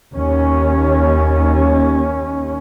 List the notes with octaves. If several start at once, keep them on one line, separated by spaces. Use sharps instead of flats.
D#2 C#4